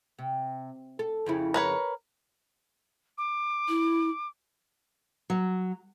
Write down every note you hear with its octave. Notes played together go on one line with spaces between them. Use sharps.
C3
A4
F2 C#3 E4
A#4 B4 C#5
D6
E4
F#3